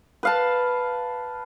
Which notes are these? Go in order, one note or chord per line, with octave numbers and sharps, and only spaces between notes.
B4 F5 A5